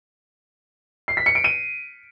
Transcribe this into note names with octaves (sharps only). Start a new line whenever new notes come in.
C7
B6
C#7
D7
D#7